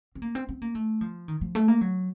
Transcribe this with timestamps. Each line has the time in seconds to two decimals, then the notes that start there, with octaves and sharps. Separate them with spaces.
0.15 C4
0.22 A#3
0.35 C4
0.49 C4
0.62 A#3
0.75 A3
1.01 F3
1.28 D#3
1.41 F3
1.55 A3
1.68 A#3
1.81 F#3